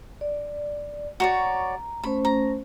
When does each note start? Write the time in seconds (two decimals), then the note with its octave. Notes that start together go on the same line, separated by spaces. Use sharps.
0.21 D5
1.20 F#4 C#5 D5 A#5
2.04 A3 C#4 C5 B5
2.25 A#5